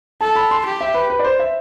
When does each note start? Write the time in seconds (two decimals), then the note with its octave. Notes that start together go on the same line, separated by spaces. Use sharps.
0.21 A4 A5
0.36 B5
0.51 C6
0.65 G4
0.81 E5
0.94 B4
1.10 B4
1.19 D5
1.24 C5
1.39 E5